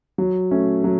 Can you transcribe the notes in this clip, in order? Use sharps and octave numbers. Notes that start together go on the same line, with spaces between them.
F#3
A3 C#4
F#3